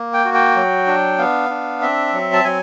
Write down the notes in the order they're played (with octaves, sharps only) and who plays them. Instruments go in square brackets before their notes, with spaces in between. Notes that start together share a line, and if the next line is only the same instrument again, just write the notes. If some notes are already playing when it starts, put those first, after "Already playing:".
Already playing: [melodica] A#3
G5
F#4
G5
F#3
D4
B3 F5
D4
C4 E5
F#3
A5
F#3 G#5